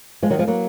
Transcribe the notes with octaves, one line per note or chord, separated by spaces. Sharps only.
F3 G#3
D#3 F#3
F3 G#3
F#3 A#3